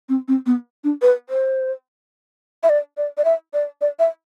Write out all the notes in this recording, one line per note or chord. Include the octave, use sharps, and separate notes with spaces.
C4
C4
B3
D4
B4
C5
E5
D5
D5
D5
E5
D5
D5
E5